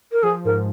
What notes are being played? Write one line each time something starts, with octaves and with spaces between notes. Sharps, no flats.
A#4
F3 G#4
G#2 A#4